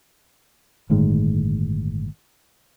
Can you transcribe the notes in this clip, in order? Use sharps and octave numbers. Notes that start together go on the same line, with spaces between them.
G1 A2 D#3 G#3